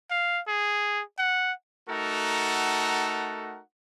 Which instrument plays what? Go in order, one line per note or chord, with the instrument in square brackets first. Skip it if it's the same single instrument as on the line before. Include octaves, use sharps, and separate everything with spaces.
[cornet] F5
G#4
F#5
[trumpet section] A3 D#4 F#4 A4 A#4 F#5